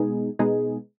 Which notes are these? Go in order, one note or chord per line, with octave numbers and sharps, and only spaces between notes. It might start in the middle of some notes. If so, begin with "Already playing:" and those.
Already playing: B2 G#3 B3 D#4 G#4
B2 G#3 B3 D#4 G#4